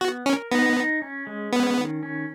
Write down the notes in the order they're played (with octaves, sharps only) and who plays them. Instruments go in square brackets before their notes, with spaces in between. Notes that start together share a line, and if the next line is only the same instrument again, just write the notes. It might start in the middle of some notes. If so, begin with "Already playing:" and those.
[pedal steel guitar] B3 [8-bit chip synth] F#4
[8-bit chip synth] C#4 [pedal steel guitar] A#4
[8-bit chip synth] B3 [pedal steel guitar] D#4
[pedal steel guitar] D#4
C#4
G#3
[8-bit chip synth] B3 [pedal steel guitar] C#4
[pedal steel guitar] D#3
C#4